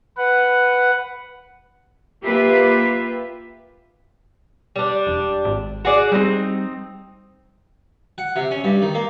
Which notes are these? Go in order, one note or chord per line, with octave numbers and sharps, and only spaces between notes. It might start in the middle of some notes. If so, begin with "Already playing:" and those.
B4 F#5
A#3 F4 G4 B4 E5
G3 D4
E1
G#1
F#4 G#4 D5
G3 C4 D#4
F#5
C3
C#4
G2
D#3
A#3